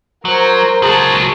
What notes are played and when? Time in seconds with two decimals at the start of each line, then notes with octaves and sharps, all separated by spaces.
0.25 F#3 A#4 C5
0.82 C#2 F#3 G#4 A5